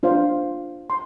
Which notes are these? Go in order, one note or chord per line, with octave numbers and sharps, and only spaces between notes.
D4 F4 C5 F5
C6